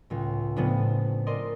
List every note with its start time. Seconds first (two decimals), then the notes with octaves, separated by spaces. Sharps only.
0.10 C#2 A2
0.56 A2 C#3 F3 B3 C4 D4
1.27 A#4 D5 D#5 C6